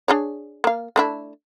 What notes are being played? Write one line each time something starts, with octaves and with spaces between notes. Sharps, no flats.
D4 G#4 C#5
A#3 F5
A3 D4 E4